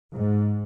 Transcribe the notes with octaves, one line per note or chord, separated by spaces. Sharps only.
G#2